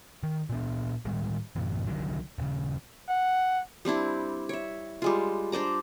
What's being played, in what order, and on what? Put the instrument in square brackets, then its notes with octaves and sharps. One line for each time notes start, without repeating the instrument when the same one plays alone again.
[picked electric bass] D#3
A#2 B3 D4
A2 D#3 G3 G#3
F#2 A2 C3 E3
C2 D3 D#3 F#3
D#1 C#3
[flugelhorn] F#5
[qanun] G3 C4 D4 E4
C#5 E5
G3 G#3 F4
D4 C5 D5 A#5